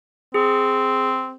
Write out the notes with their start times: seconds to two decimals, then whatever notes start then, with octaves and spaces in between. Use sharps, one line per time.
0.34 C4 G#4